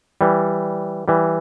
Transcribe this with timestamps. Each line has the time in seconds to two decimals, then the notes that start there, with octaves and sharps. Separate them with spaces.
0.21 E3 G3
1.08 E3 G3